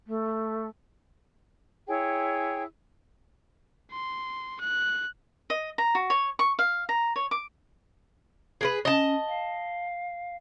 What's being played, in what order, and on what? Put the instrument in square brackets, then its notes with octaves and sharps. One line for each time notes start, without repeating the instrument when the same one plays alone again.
[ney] A3
[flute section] E4 G#4 C#5 G5
[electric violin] C6
F#6
[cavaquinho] D#5
A#5
F#4
C#5
C#6
F5
A#5
C#5
D6
[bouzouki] G#4 A#4 B4
[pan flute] C#4 [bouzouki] D#5 A5
[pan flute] F5